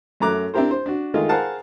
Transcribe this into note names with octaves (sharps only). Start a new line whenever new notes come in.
F#2 A3 A#5 D6 F#6
C4 D4 E4 G4 A#4 C5
C5
D4 F#4
D#3 G#3 A3 D#4 F4
G#4 A#4 C5 F5 F#5 A5